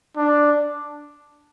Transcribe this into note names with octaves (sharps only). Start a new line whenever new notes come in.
D4